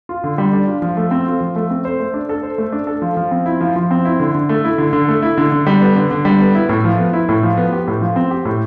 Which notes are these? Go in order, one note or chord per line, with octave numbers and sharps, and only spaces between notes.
F4
D3
G3
D4
F4
F3
A3
C4
F4
F3
A3
C4
C5
A3
D4
A4
C5
A3
D4
A4
F3
F3
C4
E4
F3
F3
C4
E4
D3
D3
A3
E4
D3
D3
A3
E4
D3
D3
G3
B3
D3
D3
G3
B3
E4
A2
F3
B3
E4
A2
F3
B3
G4
A2
F3
C4
G4
A2